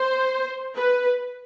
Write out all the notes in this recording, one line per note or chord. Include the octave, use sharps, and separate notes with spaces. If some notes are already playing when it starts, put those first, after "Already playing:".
Already playing: C5
B4